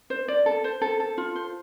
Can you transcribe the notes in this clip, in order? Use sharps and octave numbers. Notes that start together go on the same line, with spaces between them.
C5
D5
A4
C5
A4
A4
F4
C5